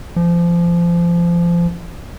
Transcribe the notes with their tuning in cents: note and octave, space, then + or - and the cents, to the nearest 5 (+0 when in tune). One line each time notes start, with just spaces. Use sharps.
F3 -25